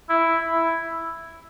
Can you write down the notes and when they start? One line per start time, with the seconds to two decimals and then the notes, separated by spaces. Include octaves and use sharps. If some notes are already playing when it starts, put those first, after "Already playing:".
0.09 E4
0.49 E4